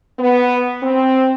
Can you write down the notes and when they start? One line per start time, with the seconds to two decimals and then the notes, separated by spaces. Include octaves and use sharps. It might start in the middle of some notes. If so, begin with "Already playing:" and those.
0.19 B3
0.83 C4